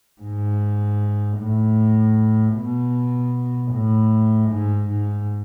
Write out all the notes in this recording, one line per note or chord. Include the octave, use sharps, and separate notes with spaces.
G#2
A2
B2
A2
G#2
G#2